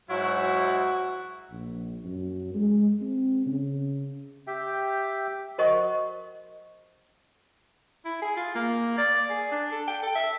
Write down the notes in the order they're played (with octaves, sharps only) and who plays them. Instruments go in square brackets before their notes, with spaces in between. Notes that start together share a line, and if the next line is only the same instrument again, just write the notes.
[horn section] G#2 F#3 E4 [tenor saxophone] F#4
[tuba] A#1
F#2
G#3
C4
C#3
[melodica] G4 E5 G5
[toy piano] F#4 A#4 C5 D#5 F#5 C#6
[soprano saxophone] E4
G#4
F4
A#3
D5
G#4
D4
A4
G5
A4
E5